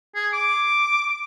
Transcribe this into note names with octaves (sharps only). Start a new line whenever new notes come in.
G#4
D6